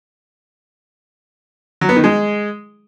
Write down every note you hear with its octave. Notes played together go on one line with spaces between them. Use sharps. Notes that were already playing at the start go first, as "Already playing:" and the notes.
F#3
B3
D#3
G#3